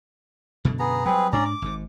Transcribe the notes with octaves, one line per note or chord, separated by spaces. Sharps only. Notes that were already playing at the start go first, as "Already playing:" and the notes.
F#2 B2 D3
B3 G#4 A#5
F#3 G3 C4 G#4 B4
G#2 C#4 D4 D5 A#5
D6
G#1 G#2